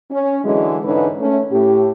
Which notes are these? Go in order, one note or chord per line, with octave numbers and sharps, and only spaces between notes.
C#4
D3 E3 F#3 G#3
G#2 D3 E3 C#4 D#4 B4
A3 C#4
A2 G4